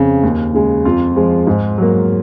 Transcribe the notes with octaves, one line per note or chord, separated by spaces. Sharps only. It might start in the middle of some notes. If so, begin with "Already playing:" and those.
Already playing: F2 C#3
D#2
C#3 G#3
F2 F4
F3 G#3
G#2
F#3 A#3